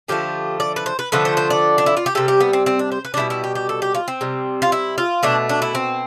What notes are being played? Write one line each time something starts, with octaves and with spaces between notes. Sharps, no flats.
D3 F3 A3 G4
D5
B4
C5
B4
D3 F3 A3 B4
C5
C5
D5
D4
E4
F4
G4
C3 G3 A4
G4
B3
C4
C4
D4
C5
B4
D4
B2 G3 E4
E4
G4
G4
A4
G4
F4
C4
C3 G3
F4
E4
F4
B2 A3 D4
D4
E4
C4